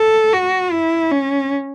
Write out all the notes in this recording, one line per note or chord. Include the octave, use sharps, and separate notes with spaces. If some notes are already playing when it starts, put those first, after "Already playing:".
Already playing: A4
F#4
E4
C#4